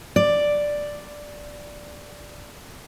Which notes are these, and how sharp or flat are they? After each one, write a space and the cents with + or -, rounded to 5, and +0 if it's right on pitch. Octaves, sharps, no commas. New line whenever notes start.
D5 +0